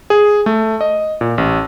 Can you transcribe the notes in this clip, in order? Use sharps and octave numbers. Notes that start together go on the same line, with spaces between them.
G#4
A3
D#5
A#2
A1